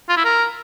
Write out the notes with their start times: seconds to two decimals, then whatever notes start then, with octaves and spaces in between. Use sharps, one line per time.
0.09 F4
0.17 E4
0.24 A#4